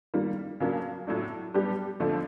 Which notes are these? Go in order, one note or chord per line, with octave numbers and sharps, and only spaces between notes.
D#3 G3 A#3
C#3 F#3 A#3 D4
A2 F#3 A3 D4
G3 B3 D4 G4 B4
F2 D3 F3 A3 D4